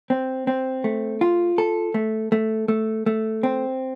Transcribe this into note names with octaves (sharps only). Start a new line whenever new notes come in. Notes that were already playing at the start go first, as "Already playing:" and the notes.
C4
C4
A3
F4
A4
A3
A3
A3
A3
C4